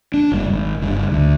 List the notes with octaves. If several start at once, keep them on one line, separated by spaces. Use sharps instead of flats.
D4
F#1 G3
G#1
F#1 G2
D2